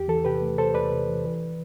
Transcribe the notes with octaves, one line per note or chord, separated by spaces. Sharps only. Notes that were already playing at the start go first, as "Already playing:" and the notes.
Already playing: E2 G4
E3 A4
C3 G4 B4
A3
C3 A4 C5
E2 B4 D5
C3
E3
E3